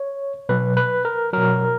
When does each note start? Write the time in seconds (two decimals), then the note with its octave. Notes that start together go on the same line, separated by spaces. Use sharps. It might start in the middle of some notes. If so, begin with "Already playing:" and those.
Already playing: C#5
0.49 B2 F#3 B4
0.77 B4
1.05 A#4
1.33 B2 F#3 A#4